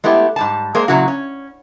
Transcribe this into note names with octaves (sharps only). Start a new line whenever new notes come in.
G#3 A3 B3 E4 G4
G#2 G3 A5
G#3 A#3 C5
A#2 C#3 F#3 E4 F#4
C#4